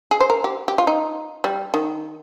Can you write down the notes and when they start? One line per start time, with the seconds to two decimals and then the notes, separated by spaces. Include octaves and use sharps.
0.11 G#4
0.21 C5
0.30 A#4
0.44 G4
0.68 G4
0.78 F4
0.87 D#4
1.44 G3
1.74 D#3